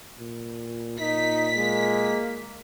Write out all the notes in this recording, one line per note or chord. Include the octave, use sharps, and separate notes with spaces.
A#2
A#2 D#4 B6
G#3 A#3